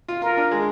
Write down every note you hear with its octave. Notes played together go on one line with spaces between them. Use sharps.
F4
F4 A#4
D4
G#3